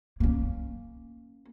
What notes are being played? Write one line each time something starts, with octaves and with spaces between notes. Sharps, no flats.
A#3 C#4